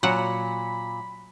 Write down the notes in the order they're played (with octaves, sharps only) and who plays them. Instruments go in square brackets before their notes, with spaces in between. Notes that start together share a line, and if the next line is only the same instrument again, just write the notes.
[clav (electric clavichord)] A#2 A#5 [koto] F#3 F#5 [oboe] B5